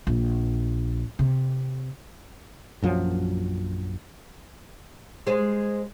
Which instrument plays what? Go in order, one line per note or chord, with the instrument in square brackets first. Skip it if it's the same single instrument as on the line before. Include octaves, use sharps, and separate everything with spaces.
[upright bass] A#1
C3
[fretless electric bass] A#1 F#2 F3 F#3
[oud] G#3 C5